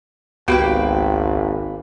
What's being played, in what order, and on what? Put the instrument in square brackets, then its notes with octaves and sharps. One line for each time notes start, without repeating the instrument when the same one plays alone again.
[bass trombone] G#1 [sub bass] C#2 [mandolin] A#3 B4 G5 [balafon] B3 F#4 G4